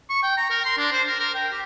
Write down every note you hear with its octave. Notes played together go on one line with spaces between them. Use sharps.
C#6
G5
A#5
A#4
C6
D4
C5
A#4
A#4
G5
G4